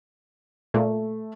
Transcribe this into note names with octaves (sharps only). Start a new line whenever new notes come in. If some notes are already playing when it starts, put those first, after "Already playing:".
A#2 A3